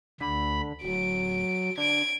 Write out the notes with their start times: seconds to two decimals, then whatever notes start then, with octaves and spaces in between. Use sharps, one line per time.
0.21 D2 D3 B5
0.83 D1 F#3 D7
1.78 D3 G#6 D7